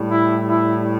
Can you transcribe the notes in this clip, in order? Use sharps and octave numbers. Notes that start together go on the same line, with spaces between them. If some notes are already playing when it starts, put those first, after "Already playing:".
Already playing: A2 G3
E4
E4